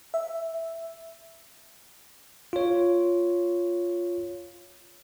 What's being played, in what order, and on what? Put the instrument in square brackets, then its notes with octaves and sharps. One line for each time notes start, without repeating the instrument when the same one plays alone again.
[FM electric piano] E5
[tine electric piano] F4 C#5